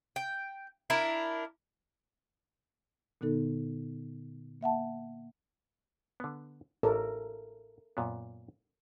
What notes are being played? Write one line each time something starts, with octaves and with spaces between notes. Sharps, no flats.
G5
D4 E4 A#4
A#2 D3 B3 D#4 A4
A#3 E5 F#5 A5
D3 B3
A1 A4 A#4
F#2 A#2 B3